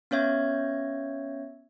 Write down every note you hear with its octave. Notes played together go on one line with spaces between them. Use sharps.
B3 C#4 C#5 E5 G#6